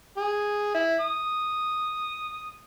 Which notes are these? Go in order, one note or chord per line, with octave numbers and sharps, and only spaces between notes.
G#4
E4
D#6